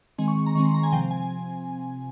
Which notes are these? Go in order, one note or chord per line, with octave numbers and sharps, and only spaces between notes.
D#3 G#3 C4 G#5
C#6
A#5
D#3 G#3 C4 C#6
C6
A#5
G#5
C3 F3 C4 G5
G#5